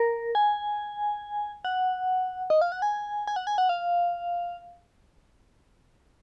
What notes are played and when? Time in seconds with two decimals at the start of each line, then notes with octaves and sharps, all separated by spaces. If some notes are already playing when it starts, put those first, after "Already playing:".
Already playing: A#4
0.35 G#5
1.65 F#5
2.50 D#5
2.61 F5
2.72 F#5
2.82 G#5
3.27 G#5
3.36 F#5
3.47 G#5
3.58 F#5
3.69 F5